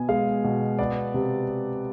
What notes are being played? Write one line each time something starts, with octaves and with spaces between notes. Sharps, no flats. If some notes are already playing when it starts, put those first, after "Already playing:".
Already playing: B2 B3 G#5
G#3 F5
B2
B3 D5
C3